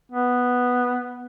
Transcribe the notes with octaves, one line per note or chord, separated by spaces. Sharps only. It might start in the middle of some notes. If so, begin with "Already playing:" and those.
B3